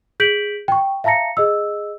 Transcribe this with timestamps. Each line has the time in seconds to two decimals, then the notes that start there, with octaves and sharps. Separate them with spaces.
0.20 G#4 G6 B6 D7 F#7
0.68 G5 C#6
1.04 E5 F5 A5 A#5 A#6 C#7
1.37 G#4 D#5 E6